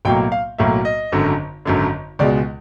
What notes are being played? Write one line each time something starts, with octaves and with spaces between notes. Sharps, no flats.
B1 A2 F#3 A#3 G5
F5
B1 A2 F#3 A#3 E5
D#5
G#1 F#2 D3
G#1 F#2 D3
C#2 B2 G#3 D5